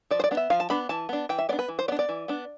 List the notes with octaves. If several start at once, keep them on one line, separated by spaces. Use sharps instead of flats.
F3 D5
C5
D5
B3 D4
E5
F3 F5
A5
B3 D4 B5
E3 A5
B3 D4
E3 G5
E5
B3 D4 D5
B4
E3
C5
B3 D4 D5
D5
E3
B3 D4